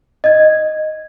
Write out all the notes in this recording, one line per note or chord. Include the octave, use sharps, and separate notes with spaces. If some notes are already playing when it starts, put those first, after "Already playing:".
D#5 G#6